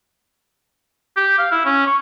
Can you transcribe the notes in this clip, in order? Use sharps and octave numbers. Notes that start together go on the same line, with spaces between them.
G4
F5
E4
C#4
C#6